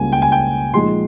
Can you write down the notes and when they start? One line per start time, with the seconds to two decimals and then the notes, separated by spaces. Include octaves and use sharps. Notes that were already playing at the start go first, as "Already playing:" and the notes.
Already playing: C#2 C#3 G3 A#3 G#5
0.12 G5
0.22 G#5
0.32 G5
0.74 A#2 F3 G#3 D#4 C6